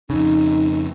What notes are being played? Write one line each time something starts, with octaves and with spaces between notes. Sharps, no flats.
F2 C#3 D#4